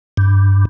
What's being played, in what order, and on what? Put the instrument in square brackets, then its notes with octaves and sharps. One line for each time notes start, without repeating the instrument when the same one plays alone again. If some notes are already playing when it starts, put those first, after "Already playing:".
[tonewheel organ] G2